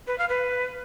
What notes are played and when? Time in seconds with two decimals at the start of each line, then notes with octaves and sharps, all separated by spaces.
0.07 B4
0.18 F5
0.29 B4